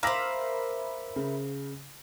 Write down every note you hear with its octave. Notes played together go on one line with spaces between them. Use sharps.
A#4 C5 E5 F5 B5 D6 A#6
C#3